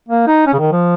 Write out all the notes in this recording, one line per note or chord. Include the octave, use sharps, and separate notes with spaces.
A#3
D#4
C#4
C#3
D#3
F3